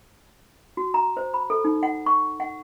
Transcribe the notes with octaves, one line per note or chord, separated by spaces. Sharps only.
F#4
A#5
C5
B5
A4
D#4
F#5
C#6
F#5